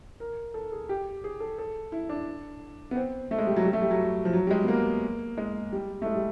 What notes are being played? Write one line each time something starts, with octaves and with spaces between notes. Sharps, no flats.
A#4
A4
G#4
G4
G#4
A4
A4
E4
D4
B3
C4
A3
G#3
G3
F#3
G3
A3
G3
F#3
F3
F#3
G3
G#3
B3
A#3
G#3
G3
A3
G#3
G3